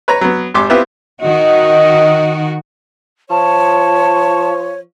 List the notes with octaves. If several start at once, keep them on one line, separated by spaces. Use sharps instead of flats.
B4 C#5 A#5
F#3 B3
G#1 G4 C6 D6
B3 C4 E4 F4 G4 B4
D#3 F#4 D#5
F3 C#5 A5